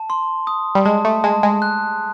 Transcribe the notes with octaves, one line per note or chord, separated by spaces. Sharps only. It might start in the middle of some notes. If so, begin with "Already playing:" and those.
Already playing: A5
C6
D#6
G3
G#3 A5
A3
G#3 A5
G#3
F#6